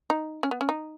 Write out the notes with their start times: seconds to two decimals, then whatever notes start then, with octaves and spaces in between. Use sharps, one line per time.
0.10 D#4
0.43 C#4
0.51 B3
0.61 C#4
0.69 D#4